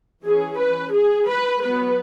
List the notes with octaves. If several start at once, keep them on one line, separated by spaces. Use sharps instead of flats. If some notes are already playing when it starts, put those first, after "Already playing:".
E3 C#4 G#4
B4
G#4
B4
F#3 B3 B4